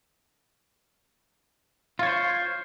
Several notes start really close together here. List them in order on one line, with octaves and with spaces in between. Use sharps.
F4 C#5 C5